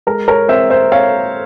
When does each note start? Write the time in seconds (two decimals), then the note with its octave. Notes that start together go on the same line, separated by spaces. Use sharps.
0.07 G#3 A#4
0.28 A#4 C#5
0.48 C4 C5 E5
0.70 C5 E5
0.91 C4 C#5 F5